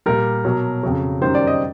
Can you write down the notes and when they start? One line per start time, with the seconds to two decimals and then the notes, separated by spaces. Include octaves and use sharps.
0.06 A#2 G3 A#4
0.45 B2 F#3
0.83 F2 C#3 F#3
1.21 F#2 D#3 G3 C5
1.35 D5
1.47 D#5